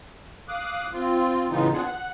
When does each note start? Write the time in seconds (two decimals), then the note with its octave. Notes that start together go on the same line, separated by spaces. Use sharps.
0.48 F5 D6 D#6 F#6
0.93 C4 F4
1.50 A2 C#3 E3 B3 D#4 F4
1.73 B3 C4 D4 F4 G#4 F#5
1.85 F#5